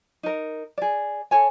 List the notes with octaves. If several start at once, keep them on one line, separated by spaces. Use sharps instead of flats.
D#4 A#4
G#4 D5
A4 C#5 G#5